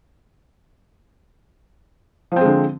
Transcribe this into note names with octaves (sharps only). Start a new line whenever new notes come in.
D3 F3 G#3 C4